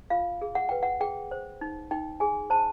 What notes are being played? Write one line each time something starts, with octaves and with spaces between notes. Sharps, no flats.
F4 F5
G#4
F#5
B4 G5
F#5
G#4 G5
C5
D#4
D#4 G5
G#4 G#5
C5 A5